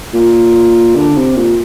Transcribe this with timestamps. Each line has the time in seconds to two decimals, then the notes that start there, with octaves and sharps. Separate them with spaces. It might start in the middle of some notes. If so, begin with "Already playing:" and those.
0.14 A#2
0.96 D3
1.17 C3
1.37 A#2